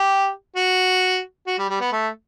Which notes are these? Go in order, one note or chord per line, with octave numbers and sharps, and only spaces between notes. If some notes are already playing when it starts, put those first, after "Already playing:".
Already playing: G4
F#4
F#4
G3
G3
B3
A3